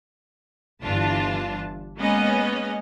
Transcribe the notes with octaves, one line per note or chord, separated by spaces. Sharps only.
G1 E3 D4 F4 A5
G#3 A#3 B3 C#4 D#5